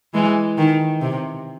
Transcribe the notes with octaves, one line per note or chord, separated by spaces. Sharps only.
E3 G#3
D#3
C3